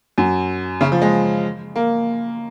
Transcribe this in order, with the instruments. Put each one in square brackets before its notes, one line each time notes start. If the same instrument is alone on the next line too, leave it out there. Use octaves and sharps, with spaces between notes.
[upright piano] F#2
C#3
F3
G#3
A#3